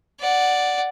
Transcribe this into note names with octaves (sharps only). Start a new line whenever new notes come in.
D5 F#5